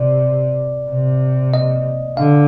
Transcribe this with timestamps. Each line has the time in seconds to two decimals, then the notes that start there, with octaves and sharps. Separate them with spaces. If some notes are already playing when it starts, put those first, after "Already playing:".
Already playing: C3 D5
0.90 C3
1.54 D#5
2.17 D3 F5